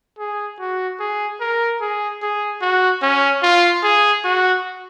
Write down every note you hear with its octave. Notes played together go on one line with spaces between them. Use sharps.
G#4
F#4
G#4
A#4
G#4
G#4
F#4
C#4
F4
G#4
F#4